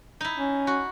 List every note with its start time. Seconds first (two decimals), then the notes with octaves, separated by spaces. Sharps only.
0.21 D#4 E4
0.37 C#4
0.67 F#4